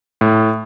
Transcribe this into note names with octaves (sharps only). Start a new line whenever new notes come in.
A2